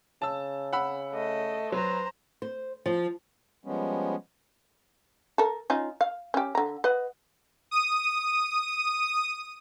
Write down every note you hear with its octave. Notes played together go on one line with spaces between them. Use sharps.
C#3 A5 E6
F#5 B5 E6
A3 D#5
F#3 B4 C5 A#5
C5
F3
F3 G3 G#3 B3 C#4
A4 A#4
C#4 D#4 F4
F5
C#4 G4
D3 A#5
B4 D#5 F#5
D#6 D#7